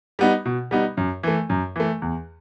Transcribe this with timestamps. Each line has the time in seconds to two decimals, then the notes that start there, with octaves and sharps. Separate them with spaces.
0.19 G3 B3 D#4
0.45 B2
0.71 G3 B3 D#4
0.97 F#2
1.23 E3 A3
1.50 F#2
1.76 E3 A3
2.02 E2